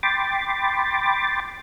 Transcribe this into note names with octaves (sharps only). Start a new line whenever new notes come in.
G5 B5 C6 D6 A6